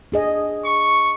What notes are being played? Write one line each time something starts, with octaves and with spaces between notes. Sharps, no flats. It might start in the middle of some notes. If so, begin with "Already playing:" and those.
D4 G#4 D#5
C#6